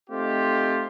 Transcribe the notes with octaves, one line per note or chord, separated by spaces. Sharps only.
A3 C4 D#4 F4 G4